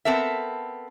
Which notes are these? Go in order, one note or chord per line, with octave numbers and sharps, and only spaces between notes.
B3 C4 A4 A#4 E5